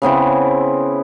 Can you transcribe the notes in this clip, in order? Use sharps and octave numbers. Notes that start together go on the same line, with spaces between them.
C#3 B3 C4 E4